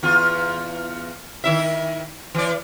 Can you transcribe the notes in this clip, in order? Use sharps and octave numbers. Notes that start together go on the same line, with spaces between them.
E2 F4
D#3 E4 E5
E3 D5